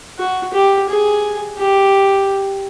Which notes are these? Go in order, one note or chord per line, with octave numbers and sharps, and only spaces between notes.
F#4
G4
G#4
G4